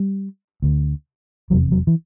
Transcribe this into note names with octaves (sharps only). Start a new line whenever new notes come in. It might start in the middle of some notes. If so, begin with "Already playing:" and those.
Already playing: G3
D2 D3
F1 E2 C3 F#3
F#3
E3